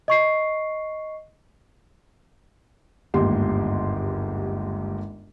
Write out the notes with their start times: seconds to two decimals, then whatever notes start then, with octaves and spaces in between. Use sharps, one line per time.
0.08 D#5 C#6 C7
3.14 G1 D#2 G#2 G4 C6